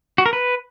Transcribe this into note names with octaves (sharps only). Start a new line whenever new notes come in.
F#4
A#4
B4